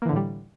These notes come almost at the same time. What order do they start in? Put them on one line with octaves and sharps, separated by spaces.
A#3 E3 D3 A2 G3